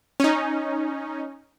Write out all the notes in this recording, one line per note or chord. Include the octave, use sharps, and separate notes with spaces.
C#4 D#4